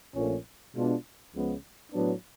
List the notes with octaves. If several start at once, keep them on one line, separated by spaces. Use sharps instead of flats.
A#1 A#2 F3 A3 C#4
B2 G#3 B3 D4 F4
C#2 C#3 F3 G#3 B3
A2 F#3 B3 D4